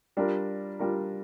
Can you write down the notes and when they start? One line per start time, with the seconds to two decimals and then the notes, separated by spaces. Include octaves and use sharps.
0.17 G3 D4 F4 A#4
0.79 G3 D4 F4 A#4